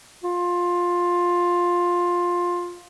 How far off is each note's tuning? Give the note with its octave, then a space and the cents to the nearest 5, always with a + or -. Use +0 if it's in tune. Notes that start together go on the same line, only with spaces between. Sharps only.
F4 +10